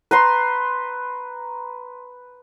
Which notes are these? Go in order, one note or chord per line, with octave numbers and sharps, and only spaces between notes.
B4 A#5 C6